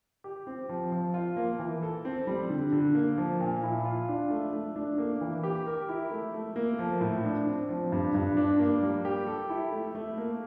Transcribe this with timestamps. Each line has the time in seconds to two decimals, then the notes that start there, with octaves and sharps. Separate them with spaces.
0.24 G4
0.47 C4
0.69 F3
0.92 F3
1.14 F4
1.37 A#3
1.59 E3
1.83 A4
2.05 C4
2.27 G3
2.50 D3
2.72 D3
2.95 A#3
3.18 F3
3.40 A#2
3.63 E4
3.85 F4
4.09 D4
4.30 A3
4.53 A3
4.76 D4
4.98 A#3
5.21 E3
5.43 G4
5.67 A#4
5.89 E4
6.12 A3
6.34 A3
6.56 A#3
6.79 F3
7.01 A2
7.25 D4
7.47 C4
7.69 F3
7.92 G2
8.15 G2
8.37 D4
8.60 A#3
8.82 G3
9.05 G4
9.27 A4
9.50 E4
9.72 A3
9.95 A3
10.18 A#3